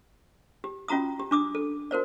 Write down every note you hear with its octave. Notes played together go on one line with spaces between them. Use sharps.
G4
C#4 F4 F#4 A#5 D#6
G4
D4 D6 D#6
A4
F#4 A#4 C5 D5